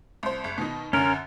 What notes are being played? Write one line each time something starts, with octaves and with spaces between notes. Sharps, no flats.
C2 C5
F#1
B2 D#3 D#4
F#2 D3 C#4 A#4